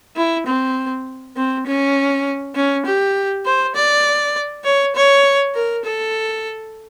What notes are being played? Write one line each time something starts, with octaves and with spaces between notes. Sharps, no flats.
E4
C4
C4
C#4
C#4
G4
C5
D5
C#5
C#5
A#4
A4